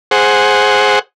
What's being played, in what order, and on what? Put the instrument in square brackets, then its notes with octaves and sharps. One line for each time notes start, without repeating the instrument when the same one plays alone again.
[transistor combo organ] G#4 C5 F#5